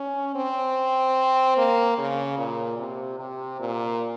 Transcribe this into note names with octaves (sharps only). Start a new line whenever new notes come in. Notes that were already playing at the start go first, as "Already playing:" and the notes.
Already playing: C#4
C4
A#3
C#3
A#2
C3
C3
A#2